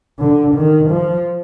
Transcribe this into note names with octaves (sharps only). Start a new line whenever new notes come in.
D3
D#3
F3